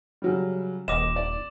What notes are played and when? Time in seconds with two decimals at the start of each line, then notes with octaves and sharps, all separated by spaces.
0.22 C#3 F#3 G3
0.88 D#1 D#2 D#5 D6 A#6 E7
1.16 D5